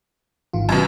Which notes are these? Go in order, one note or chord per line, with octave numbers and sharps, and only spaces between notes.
G#1 D#3 F4
F#2 B2